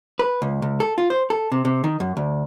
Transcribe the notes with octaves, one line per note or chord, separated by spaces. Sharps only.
B4
C#2
C#2
A4
F4
C5
A4
C3
C3
D#3
F#2
D2